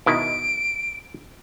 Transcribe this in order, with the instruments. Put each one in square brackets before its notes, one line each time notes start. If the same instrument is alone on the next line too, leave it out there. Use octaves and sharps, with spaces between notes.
[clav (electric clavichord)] B2 D#3 E4 [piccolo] D7